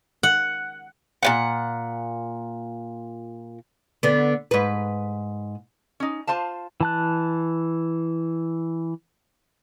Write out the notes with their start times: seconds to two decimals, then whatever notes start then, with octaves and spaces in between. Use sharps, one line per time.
0.23 F#5
1.23 A#2 B3 F#5
4.03 D3 B3
4.51 G#2 B4
6.00 C#4 D#4
6.27 F4 C5 F5 A5
6.80 E3 A5 F#6